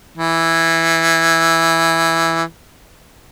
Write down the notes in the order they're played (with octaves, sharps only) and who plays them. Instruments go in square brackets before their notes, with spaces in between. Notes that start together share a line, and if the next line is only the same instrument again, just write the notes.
[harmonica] E3